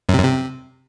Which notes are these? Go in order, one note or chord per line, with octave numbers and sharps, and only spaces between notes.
F#2
C3
F#2
C3